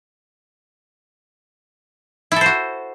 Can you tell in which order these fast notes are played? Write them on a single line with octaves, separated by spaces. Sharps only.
E4 A4 C5 F#4